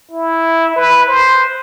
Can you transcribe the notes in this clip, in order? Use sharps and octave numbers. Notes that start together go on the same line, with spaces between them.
E4
B4
C5